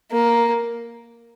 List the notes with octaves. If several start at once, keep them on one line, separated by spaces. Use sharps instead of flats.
A#3